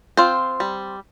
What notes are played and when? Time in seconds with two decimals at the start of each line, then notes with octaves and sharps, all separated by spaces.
0.17 C4 F4 C5
0.60 G3